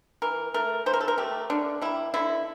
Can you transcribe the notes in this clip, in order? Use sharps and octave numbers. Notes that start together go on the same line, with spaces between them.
E3 A#4
A3 A#4
E3 C5
A#4
A4
A#4
A3 G4
D3 D4
G3 A#3 E4
D3 E4